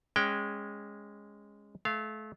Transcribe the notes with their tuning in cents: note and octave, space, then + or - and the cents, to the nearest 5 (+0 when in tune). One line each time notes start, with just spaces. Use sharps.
G#3 -10 C#4 +0 G5 +0
A3 -30 F5 -20